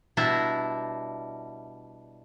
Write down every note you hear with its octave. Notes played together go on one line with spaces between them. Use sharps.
B2 G3 D4 E4 E5 A#5